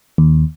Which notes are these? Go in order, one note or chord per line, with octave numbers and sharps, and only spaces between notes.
D#2